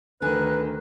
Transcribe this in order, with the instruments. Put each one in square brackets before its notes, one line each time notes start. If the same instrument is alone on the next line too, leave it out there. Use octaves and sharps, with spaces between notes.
[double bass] D2 D#3 [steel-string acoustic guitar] D3 G#5 [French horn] B4 [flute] F#6